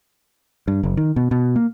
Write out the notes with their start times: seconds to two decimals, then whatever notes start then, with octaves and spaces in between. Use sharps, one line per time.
0.68 G2
0.83 F#1
0.97 D#3
1.16 B2
1.31 B2
1.56 A#3